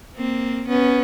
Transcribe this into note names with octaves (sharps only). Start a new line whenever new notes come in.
A#3 C4
B3 C#4